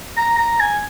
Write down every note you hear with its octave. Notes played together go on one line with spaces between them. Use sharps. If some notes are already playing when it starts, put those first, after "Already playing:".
A#5
A#5
G#5